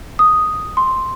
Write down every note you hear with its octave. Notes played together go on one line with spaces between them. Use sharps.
D#6
C6